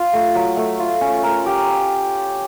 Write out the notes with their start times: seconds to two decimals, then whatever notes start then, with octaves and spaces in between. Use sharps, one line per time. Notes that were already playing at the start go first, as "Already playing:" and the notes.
Already playing: F4
0.13 A3
0.35 F#3
0.57 A3
0.79 F4
1.01 C#4
1.23 A#4
1.46 G4